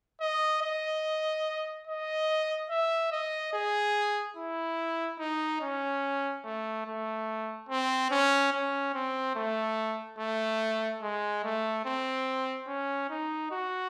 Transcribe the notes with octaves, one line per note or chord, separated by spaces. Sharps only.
D#5
D#5
D#5
E5
D#5
G#4
E4
D#4
C#4
A3
A3
C4
C#4
C#4
C4
A3
A3
G#3
A3
C4
C#4
D#4
F#4